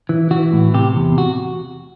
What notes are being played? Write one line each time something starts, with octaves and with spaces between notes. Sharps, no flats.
E3
E3 F#4
A2
C3 G4
E2
F#4